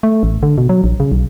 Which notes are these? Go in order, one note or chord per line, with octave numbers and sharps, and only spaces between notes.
A3
A1
D3
B2
F#3
A#1
C#3
B1